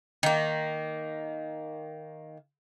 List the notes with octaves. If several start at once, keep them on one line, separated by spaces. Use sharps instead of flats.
D#3 A#3